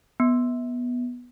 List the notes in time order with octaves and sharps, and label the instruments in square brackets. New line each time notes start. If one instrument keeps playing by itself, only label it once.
[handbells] B3